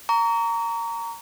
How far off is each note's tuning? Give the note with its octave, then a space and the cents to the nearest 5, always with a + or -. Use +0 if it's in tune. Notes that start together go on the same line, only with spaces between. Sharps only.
A#5 -15 C#6 +40